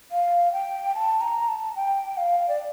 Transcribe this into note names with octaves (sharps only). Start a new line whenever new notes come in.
F5
G5
A5
A#5
A5
G5
F5
D5